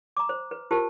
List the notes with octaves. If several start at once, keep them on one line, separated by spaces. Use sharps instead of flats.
A#5 D6
C5
B4
F4 G4 A#4 C5 A5